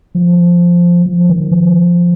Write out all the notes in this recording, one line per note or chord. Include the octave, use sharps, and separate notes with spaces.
F3
F3
D#3
F3